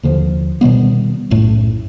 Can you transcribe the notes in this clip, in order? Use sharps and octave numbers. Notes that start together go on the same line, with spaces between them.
D#2 D3 F3
B2 D#3 G3 B3
B1 F#2 A2 A3